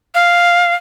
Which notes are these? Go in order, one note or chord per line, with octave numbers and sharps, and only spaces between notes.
F5